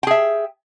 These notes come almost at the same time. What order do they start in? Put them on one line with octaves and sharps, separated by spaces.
G5 G#4 E5